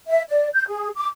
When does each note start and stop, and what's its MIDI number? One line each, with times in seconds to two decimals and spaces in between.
0.07 0.22 76
0.29 0.48 74
0.54 0.64 91
0.68 0.89 68
0.95 1.06 86